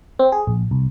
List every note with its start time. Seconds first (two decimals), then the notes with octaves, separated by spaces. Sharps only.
0.19 C4
0.32 G#4
0.47 A#1
0.71 C2